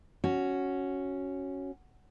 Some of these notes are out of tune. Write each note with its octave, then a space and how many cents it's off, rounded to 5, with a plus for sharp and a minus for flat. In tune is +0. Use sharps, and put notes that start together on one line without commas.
C#4 +0 F#4 +0